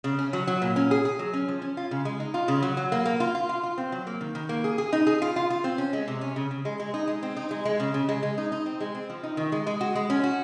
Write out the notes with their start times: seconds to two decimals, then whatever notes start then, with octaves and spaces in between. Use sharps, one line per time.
0.04 C#3
0.19 C#4
0.33 F#3
0.47 F#3
0.62 A#2
0.76 C#4
0.91 G#4
1.05 G#4
1.19 F#3
1.33 C#4
1.48 F3
1.62 C#4
1.77 F4
1.91 C#3
2.05 G#3
2.20 D#4
2.34 F4
2.48 C#3
2.63 F#3
2.77 F#3
2.92 A#3
3.05 A#3
3.20 F4
3.35 F4
3.49 F4
3.63 F4
3.78 C4
3.92 F#3
4.07 A#3
4.21 D#3
4.35 D#3
4.49 A#3
4.64 G#4
4.78 G#4
4.93 D#4
5.07 G#4
5.22 F4
5.36 F4
5.50 F4
5.64 C4
5.78 C#4
5.93 G#3
6.08 C3
6.21 C#4
6.36 C#3
6.51 C#3
6.65 G#3
6.80 G#3
6.94 D#4
7.08 G#3
7.23 C4
7.37 D#4
7.51 G#3
7.65 G#3
7.80 C#3
7.94 C#3
8.09 G#3
8.23 G#3
8.38 D#4
8.52 D#4
8.66 C4
8.80 G#3
8.95 C4
9.10 F3
9.23 D#4
9.37 D#3
9.52 G#3
9.67 G#3
9.81 F#4
9.95 G#3
10.10 C#4
10.24 F#4